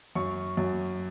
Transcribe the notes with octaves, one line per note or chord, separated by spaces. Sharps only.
F#2 C#6
F#2